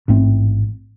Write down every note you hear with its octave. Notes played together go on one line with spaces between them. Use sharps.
A1 G#2 A3 C4